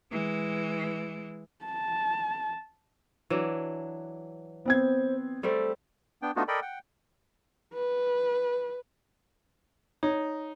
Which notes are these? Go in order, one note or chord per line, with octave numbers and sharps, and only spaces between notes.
E3 G#3
A5
E3 F#3 D4
B3 C4 C5 G#6
G3 A3 C4 A4
B3 D4 G5
A3 B3 D4 D#4 F4 F#4
A4 A#4 D5 D#5 G5 B5
F#5 G5
B4
D#4 C#5